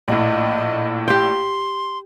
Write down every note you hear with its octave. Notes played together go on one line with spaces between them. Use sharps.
A#1 A2 D#5
G4 G5 C6